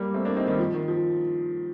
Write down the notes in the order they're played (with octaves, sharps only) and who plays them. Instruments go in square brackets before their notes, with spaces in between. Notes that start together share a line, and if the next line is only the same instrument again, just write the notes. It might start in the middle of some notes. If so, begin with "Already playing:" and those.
Already playing: [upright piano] G3 A#3
A3 C4
A#3 D4
C4 D#4
D#3 G3
F3
D#3
F3